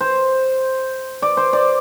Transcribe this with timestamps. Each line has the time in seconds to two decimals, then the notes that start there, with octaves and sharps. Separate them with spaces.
0.01 C5
1.22 D5
1.37 C5
1.53 D5